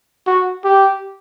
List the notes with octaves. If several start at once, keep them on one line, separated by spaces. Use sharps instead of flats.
F#4
G4